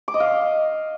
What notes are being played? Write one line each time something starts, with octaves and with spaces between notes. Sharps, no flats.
D6
D#5
F5